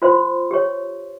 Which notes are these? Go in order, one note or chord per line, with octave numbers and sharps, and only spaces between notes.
F4 C5 C6
G4 C#5